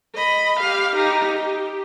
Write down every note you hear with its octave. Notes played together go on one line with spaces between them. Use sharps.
D#5 B5
G4 F5
D#4 G4
G4